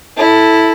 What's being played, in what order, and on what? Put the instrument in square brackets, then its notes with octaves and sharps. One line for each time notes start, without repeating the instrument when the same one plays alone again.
[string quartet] E4 A4